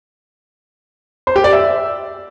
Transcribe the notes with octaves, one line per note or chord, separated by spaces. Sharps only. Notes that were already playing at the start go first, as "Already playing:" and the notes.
C5
G4
D5
E5